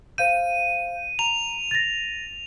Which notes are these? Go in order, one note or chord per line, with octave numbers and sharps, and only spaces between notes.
C5 F5 G6 D#7
A#5 F7
A6 A#6